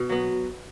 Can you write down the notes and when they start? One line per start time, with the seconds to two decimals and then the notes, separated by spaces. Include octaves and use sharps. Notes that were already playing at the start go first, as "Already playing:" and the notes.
Already playing: B2
0.10 F#3 B3